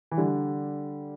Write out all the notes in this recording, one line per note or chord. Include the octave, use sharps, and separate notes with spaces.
E3
D3 G3